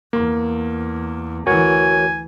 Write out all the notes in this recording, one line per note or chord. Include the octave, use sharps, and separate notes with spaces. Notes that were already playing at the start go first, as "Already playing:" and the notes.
E2 A#3
D2 E3 F#4 A#4 C#5 G#5